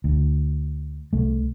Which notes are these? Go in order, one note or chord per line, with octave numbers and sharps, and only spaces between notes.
D2
C2 A3